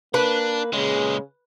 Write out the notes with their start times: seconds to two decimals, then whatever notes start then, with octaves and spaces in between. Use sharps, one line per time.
0.14 A#3 D4 B4
0.73 A#2 C#3 G#3